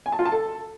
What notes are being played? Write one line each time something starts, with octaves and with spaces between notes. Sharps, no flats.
G#5
A5
F4
A5
A4